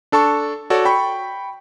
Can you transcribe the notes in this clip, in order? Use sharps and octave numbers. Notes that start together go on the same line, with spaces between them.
D4 A4 A5 C#6
F#4 A4 C#5 D5
G5 B5 C#6